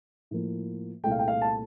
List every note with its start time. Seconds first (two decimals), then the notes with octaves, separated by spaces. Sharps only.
0.31 A2 F3 A#3
1.04 C2 A#2 A3 G5
1.11 F5
1.19 G5
1.28 F5
1.42 A5